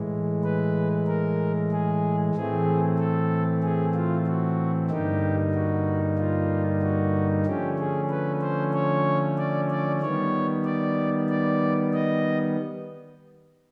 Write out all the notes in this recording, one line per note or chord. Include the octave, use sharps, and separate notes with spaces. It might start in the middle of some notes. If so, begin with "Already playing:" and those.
Already playing: A2 E3 G#3
B4
A#4
G#4
A2 E3 A3 C4 G#4
A4
G#4
F4
F#4
G2 D3 G3 A#3 D#4 G4
F#4
F4
F#4
D3 F3 A3 C#4 G4
G#4
B4
C5
C#5
D5
D5
D#3 G3 B3 C#5
D5
D5
D#5